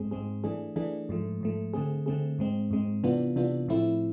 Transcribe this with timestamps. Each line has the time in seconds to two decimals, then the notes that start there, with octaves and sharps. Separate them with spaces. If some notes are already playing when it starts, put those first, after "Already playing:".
Already playing: G#2 G#3 C4 G#4
0.11 G#2 G#3 C4 G#4
0.44 E3 A3 D4 G#4
0.76 E3 A3 D4 G#4
1.09 G#2 F3 A3
1.41 G#2 F3 A3
1.74 D3 A3 C4 G#4
2.06 D3 A3 C4 G#4
2.39 G#2 G#3 C4
2.71 G#2 G#3 C4
3.03 C3 E3 B3 D4 F4
3.36 C3 E3 B3 D4 F4
3.68 A2 F3 A3 C4 E4